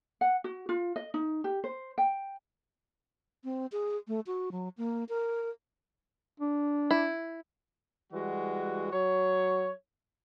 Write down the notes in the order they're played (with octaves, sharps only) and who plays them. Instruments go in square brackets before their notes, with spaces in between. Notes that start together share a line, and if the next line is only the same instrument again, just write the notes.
[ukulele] F#5
F#4
F4
D#5
D#4
G4
C5
G5
[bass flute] C4
G#4
A3
F#4
F#3
A#3
A#4
[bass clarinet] D4
[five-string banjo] E4
[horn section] E3 G3 G#3 F#4
F#3 C#5